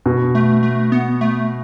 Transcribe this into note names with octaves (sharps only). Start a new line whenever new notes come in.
B2
A3
A3
B3
A3